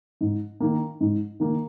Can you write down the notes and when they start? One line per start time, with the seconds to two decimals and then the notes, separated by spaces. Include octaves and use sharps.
0.21 G#2
0.60 D#3 A#3
1.01 G#2
1.40 D#3 A#3